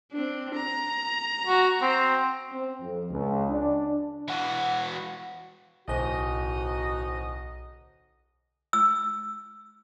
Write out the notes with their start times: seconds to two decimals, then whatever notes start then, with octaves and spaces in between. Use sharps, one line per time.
0.12 C4 D4
0.55 A#5
1.47 F#4
1.82 C4
2.52 C4
2.81 F2
3.11 C#2
3.50 D4
4.28 E3 F#4
5.88 D1 B1 D#4 F#4 C5 D#5
8.73 E6